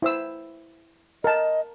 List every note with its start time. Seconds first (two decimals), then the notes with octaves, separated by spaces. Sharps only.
0.02 E4 C5 E6
1.24 A#4 D#5 A5